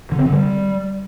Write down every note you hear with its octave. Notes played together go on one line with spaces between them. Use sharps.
D3
C4
D3
G3